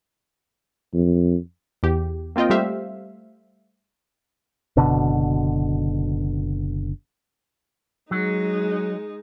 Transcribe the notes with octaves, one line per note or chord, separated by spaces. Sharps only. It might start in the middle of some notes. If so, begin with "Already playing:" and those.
F2
E2 G4
A#3 C4 F4 D#5 G5
G3 A3 G4 C5 E5 F5
F#1 B2 D3
F#3 G#3 D#4